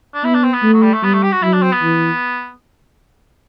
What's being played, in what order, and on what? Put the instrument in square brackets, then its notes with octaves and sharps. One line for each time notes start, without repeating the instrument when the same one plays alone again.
[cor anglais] D4
[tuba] B3 [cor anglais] E4
[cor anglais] D4
C4
B3
[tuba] A3
[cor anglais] F#3
G3
A3
[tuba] G3 [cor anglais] B3
[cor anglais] A3
G4
F#4
[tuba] F#3 [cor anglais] E4
[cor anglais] D4
C4
B3
[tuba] E3